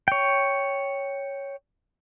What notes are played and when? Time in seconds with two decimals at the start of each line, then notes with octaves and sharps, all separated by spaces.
0.08 C#5 G5